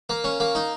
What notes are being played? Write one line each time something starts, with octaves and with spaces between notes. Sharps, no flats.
A#3
C#4
A#3
D#4